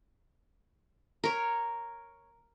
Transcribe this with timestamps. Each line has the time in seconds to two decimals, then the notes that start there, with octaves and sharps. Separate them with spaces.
1.24 A#4 C#5